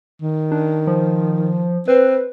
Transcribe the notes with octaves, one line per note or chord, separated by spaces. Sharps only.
D#3
D4
F3
C4 B4